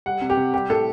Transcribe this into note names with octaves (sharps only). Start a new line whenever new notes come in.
G3 F#5
C3
G4
C3
G3 G4
A2 A4